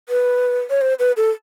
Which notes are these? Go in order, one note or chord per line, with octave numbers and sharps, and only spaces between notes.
B4
C#5
C5
B4
A4